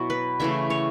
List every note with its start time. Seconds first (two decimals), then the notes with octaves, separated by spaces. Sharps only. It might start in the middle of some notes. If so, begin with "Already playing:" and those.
Already playing: B2 F#3 B3 E4 F#4
0.10 B4
0.40 C#3 E3 A3 E5
0.70 C#5